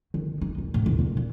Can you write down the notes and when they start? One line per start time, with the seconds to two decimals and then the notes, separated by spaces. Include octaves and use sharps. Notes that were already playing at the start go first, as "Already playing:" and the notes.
0.14 D#3
0.41 D#4
0.58 D#1
0.74 A2
0.86 D#2
0.99 A#2
1.17 A#2